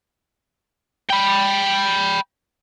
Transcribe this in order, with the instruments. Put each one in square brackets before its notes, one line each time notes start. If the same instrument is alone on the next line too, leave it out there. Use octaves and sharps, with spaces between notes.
[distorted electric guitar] G5 B5